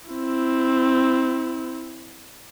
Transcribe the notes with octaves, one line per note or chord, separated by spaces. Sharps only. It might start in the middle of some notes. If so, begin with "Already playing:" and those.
C4 E4